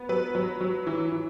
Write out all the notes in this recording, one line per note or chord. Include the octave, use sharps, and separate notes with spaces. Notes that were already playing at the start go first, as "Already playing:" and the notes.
Already playing: B3
F#3 B4
F#3
F#3
E3
E3